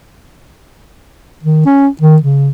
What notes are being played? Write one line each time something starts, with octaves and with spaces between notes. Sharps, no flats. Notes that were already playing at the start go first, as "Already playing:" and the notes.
D#3
C#4
D#3
C#3